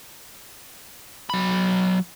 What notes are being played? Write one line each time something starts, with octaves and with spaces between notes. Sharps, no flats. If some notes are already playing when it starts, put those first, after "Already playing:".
F#3 B5